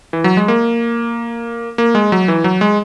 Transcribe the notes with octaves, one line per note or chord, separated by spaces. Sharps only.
E3
F#3
G#3
A#3
A#3
G#3
F#3
E3
F#3
G#3